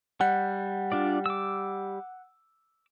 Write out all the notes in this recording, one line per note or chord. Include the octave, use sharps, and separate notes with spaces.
G3 F#5
D4 F4 D5
D6 E6